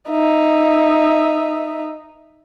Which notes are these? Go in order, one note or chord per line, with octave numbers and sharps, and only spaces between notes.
D#4 E5